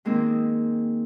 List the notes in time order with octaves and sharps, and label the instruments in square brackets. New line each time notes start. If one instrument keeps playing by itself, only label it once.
[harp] D#3 G#3 A#3 C4 D#4